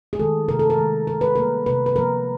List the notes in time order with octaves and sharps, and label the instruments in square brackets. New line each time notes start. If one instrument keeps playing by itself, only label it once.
[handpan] G#4
D#3 G#3 A4
C3 A#4
A4
A#4
D#3 G#3
D#3 A#4
B4
G3 A#3 A#4
C3 B4
B4
F3 A#3 A#4